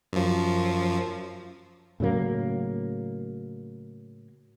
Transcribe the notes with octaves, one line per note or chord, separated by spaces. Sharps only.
F#2 F3
A2 C#3 F#3 A#3